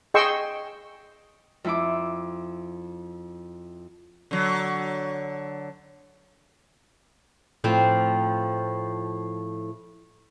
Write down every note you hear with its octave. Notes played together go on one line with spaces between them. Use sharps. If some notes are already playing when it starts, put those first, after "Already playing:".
G#4 D#5 G5 C6 C#6 E6
F2 E4 D6
D3 F#3
A2 F3 C4